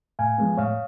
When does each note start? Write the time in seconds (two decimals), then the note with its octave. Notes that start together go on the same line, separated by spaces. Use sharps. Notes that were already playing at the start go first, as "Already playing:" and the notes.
0.19 A2 F5 G#5
0.38 F3 G#3 B3
0.57 A2 C#5 F5